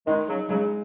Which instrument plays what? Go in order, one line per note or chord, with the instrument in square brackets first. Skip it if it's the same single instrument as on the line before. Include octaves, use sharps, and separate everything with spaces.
[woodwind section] D#3 G#3 [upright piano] D#4
[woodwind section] C#3 F#3
[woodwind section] C#3 F#3 [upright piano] G#3